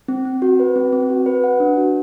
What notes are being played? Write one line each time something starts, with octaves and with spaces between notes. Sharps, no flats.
C4
C4
F#4
B4
C4
C4
F#4
B4
F#5
D4
F#4